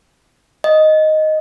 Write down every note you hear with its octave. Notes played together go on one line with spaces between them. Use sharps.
D#5